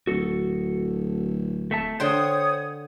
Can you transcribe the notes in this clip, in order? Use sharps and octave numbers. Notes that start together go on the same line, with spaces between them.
D1 F#4 A4
A3 E5 A5
D3 C5 C#5 G5 C6 D#6 G#6